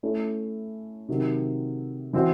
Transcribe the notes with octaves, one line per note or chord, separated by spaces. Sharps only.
A3 C#4 E4
C3 D#3 F#3 C4
E3 C4 F#4 C5